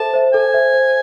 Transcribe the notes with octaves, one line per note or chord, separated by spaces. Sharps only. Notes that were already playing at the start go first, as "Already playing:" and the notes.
Already playing: A4 C5 E5 A5
C5 E5
A4 G#5
C5 E5
C5